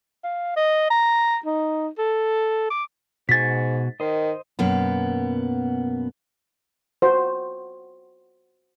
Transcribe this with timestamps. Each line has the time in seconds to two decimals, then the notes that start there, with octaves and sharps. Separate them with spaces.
0.24 F5
0.56 D#5
0.90 A#5
1.46 D#4
1.98 A4
2.70 D6
3.29 G#2 B2 F#4 G#5 A6 B6
4.00 D#3 C5 D#5
4.59 F#2 B2 A#3 B3
7.02 F#4 C5